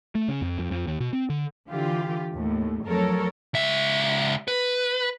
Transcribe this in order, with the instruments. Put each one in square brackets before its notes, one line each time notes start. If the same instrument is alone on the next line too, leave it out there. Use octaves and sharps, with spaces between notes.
[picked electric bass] A3
C#3
F2
F2
F2
D#2
B2
C4
D3
[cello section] D3 E3 F4 G4
D#2 A2
F2 F#3 A3 A4 A#4 C#5
[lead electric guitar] C#2 E5
B4